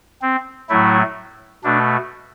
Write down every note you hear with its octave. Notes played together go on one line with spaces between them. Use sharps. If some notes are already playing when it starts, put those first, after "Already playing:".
C4
A2 F#3 A3 E4
B2 A3 D4